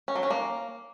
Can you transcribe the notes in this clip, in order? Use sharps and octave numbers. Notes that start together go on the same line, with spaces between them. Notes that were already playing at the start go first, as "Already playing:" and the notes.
C#4
F#3
C#4
A#3